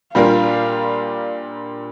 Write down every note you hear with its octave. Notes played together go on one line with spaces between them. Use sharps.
A#2 G3 D4 F4 A#4 F5